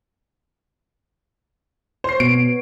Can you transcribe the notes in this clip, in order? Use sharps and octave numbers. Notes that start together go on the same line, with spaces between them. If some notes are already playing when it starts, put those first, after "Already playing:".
C5 C#5 C7
B2 B3 D7
B3